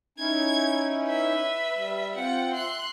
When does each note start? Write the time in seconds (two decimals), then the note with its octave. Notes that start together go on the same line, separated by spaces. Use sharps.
0.18 C#4 D#4 E4 G#6
1.05 B4 E5
1.76 G3
2.16 C4 F4 F#5 G5
2.53 E5 C6 F#6